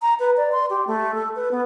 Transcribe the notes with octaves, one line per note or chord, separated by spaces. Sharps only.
A#5
B4
D5
C6
G4
A3
A4
B4
B3